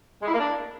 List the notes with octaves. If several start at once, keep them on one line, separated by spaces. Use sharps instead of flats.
G#3
E4
A#3
D4